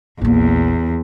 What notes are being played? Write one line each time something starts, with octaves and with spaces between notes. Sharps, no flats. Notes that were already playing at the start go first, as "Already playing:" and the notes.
A#1 E2 A#3